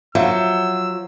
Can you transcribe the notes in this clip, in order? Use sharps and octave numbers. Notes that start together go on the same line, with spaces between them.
F3 F#3 E5 E6